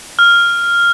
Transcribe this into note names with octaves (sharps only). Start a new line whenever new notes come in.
F6